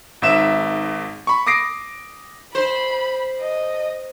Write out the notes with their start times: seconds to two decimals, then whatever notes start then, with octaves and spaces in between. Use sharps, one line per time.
0.22 G#1 G#2 E5 E7
1.27 B5 C#6
1.47 D6 D#6 A#6 C7 D7
2.55 C5 B5
3.41 D#5